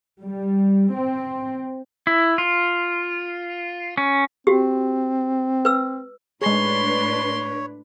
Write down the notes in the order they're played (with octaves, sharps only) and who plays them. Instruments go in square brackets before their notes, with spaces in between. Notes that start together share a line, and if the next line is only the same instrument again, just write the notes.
[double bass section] G3
C4
[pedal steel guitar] E4
F4
C#4
[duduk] C4 [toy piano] F#4 G4
[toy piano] B4 E6
[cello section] A2 D4 B4 [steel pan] G#3 G#4 [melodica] C#5 [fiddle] C6